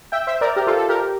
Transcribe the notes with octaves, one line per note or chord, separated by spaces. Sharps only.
E5 G5
C5 E5
A#4 D5
G4 A#4
F4 A4
A4
G4 A#4